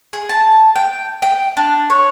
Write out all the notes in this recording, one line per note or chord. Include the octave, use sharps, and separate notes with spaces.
G#4
A5
G5
G5
D4
C#5